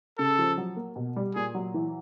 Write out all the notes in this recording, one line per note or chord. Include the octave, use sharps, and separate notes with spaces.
C#3 A4
F3
F#3
A#3
B2
G3
A#2 G#4
F#3
E3